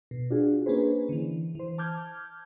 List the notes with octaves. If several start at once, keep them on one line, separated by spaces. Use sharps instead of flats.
B2
D4 F4 F#4 G#4
A#3 C#4 D4 G#4 B4 C5
D3 E3
E3 C5
A5 D6 F6 G6 G#6